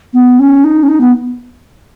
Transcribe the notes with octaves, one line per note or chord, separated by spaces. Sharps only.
B3
C#4
D#4
C#4
D#4
B3